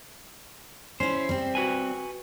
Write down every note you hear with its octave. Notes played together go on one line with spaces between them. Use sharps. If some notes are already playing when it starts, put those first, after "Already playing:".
C#4 E4 C5
G3 C4
F#4 B4 G#5